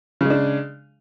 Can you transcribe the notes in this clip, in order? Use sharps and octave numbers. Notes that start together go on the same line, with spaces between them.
C#3 G#3 D4